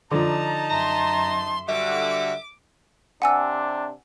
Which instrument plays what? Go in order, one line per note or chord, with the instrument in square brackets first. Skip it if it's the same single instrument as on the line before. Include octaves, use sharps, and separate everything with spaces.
[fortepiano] D3 F3 [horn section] D#4 A5 [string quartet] A#5
[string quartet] F#2 E5 C6 [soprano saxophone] A#5
[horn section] D3 G3 F#4 [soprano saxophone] E5 [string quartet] D6
[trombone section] C3 D4 [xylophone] F#5 G#5 E6